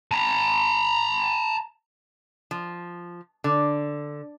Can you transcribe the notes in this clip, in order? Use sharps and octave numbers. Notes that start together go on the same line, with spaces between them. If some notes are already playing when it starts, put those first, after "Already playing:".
A5 A#5
F3
D3